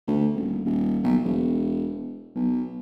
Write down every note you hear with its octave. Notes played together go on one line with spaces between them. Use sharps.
D2
D#1
D#1
B1
E1
B1